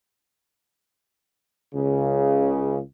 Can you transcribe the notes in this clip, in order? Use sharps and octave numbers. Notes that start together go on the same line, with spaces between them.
C#2 C#3